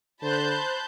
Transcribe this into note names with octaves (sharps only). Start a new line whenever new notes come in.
D3 C5 A5 B5 F#6 G6